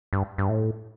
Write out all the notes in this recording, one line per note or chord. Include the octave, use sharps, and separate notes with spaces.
G2
G2
A2